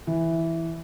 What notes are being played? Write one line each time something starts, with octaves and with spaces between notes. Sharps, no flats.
E3